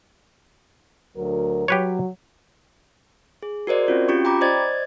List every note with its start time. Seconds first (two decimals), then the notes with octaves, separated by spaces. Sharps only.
1.17 D2 F#3 A#4
1.68 F#3 G4 B4 C#5
3.43 G#4
3.67 F#4 A#4 C5 D5 D#5
3.87 C4 C#4 F4 F#4
4.08 C#4 F4 G4 C#6
4.25 G5 A#5 B5 D6
4.41 C5 D5 D#5 G#6 A6